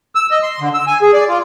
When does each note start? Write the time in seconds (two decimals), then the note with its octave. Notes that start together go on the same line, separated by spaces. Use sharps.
0.15 E6
0.31 D#5
0.43 C6
0.60 D3
0.74 E6
0.87 G#5
1.02 G#4
1.13 D5
1.29 F4